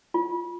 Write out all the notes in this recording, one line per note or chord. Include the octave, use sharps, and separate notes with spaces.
F4